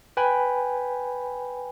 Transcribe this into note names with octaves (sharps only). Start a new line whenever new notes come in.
B4 G5 G#5 B5